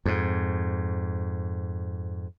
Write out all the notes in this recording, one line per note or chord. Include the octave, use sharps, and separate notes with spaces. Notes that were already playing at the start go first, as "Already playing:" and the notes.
F2 G#2